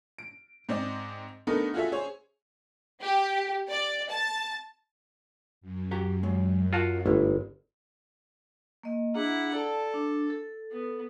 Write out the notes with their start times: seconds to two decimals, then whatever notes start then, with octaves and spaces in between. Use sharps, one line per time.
0.18 D7
0.69 G#2 C4 D5 D#5
1.47 A3 B3 D4 D#4 A#4
1.74 F4 F#4 G#4 A4 E5
1.92 G#4 C5 C#5
3.01 G4
3.69 D5
4.10 A5
5.61 F#2
5.91 F#4 G4 A#5
6.23 F#3 G#3
6.73 F4 F#4 A#4 F#5 A5
7.06 G1 A3 E4
8.83 A#3 D#5
9.15 D4 E4 G#4 F#5 A#5
9.54 A4 D5 A5
9.94 D4
10.30 A4
10.71 B3